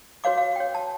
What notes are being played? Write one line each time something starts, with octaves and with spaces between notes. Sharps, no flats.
F#4 B4 C#5 F5 D6
F5
C#5 G5
A5